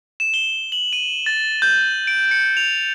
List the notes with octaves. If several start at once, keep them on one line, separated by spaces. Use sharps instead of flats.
E7
G7
F#7
D#7
A6
G6
D7
C#7
F7